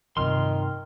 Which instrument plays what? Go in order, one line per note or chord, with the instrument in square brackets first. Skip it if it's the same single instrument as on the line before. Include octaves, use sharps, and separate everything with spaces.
[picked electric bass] G2 C3 F3 [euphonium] D#3 [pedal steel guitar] C6 F6